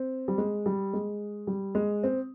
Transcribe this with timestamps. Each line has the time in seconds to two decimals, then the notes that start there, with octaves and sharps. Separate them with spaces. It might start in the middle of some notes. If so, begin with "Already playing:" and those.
Already playing: C4
0.28 G3
0.38 G#3
0.66 G3
0.93 G#3
1.47 G3
1.75 G#3
2.03 C4